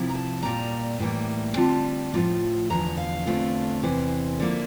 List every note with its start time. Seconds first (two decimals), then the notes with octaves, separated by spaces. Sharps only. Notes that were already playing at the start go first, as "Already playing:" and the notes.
Already playing: C3 F3 E4
0.09 A#5
0.15 A5
0.42 A#2 G3 A#3 A#5
0.99 A2 E3 G3 A#3
1.56 D3 G3 C4 F4 A5
2.14 A2 F3 A#3 F4
2.70 E2 D3 F3 A#5
2.97 F5
3.26 E2 D3 A3 C4 F4
3.83 E2 C3 E3 C5
4.40 D3 F3 A#3 E4